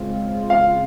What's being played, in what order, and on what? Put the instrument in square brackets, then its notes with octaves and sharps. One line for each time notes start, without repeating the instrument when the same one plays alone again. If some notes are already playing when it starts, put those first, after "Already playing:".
Already playing: [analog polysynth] C#3 G#3 C4 F4
[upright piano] F5